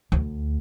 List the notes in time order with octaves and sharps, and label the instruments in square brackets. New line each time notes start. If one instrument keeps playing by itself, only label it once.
[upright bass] D2